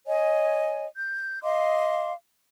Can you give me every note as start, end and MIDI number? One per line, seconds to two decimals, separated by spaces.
0.06 0.85 73
0.06 0.85 75
0.06 0.85 80
0.97 1.42 91
1.42 2.12 75
1.42 2.12 77
1.42 2.12 84
1.42 2.12 86